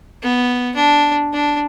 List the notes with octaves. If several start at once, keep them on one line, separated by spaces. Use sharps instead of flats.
B3
D4
D4